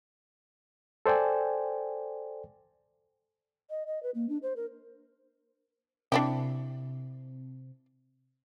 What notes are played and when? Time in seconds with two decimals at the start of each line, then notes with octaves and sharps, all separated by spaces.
1.06 A4 C5 D5 G5 G#5
3.70 D#5
3.87 D#5
4.03 B4
4.15 A#3
4.29 D4
4.42 C5
4.56 A#4
6.12 C3 D4 E4 G4